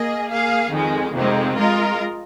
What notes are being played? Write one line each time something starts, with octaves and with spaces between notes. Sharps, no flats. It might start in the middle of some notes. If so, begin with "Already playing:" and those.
Already playing: A#3 G#4 D#5
A#3 G#4 F5
F2 D#3 G#3
F2 C3 D#3 G#3 C4
G#3 F4 A#4 D#5